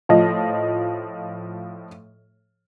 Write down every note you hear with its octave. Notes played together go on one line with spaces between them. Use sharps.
A2 F3 D#5